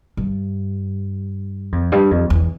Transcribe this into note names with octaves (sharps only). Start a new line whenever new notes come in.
G2
F2
G2
F2
E2